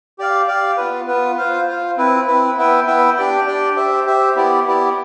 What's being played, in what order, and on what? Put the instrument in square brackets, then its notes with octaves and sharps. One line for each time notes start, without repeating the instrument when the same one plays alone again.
[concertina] G4 D5 F5
G4 D5 F5
B3 F4 B4
B3 F4 B4
F4 C5 F5
F4 C5 F5
C4 E4 B4
C4 E4 B4
B3 E4 B4 E5 G5
B3 E4 B4 E5 G5
D4 G4 D5 G5
D4 G4 D5 G5
G4 C5 E5
G4 C5 E5
B3 E4 G4 D5
B3 E4 G4 D5